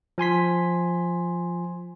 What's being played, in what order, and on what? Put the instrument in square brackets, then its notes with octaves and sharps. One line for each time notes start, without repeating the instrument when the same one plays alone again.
[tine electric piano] F3 G#5 C6 B6